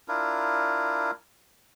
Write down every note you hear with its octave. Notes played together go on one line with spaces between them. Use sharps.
D4 E4 F4 A#4